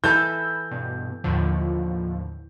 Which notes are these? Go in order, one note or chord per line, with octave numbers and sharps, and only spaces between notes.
E3 A4 B5 E6 G6
G2 B2
D#2 A2 D3 F3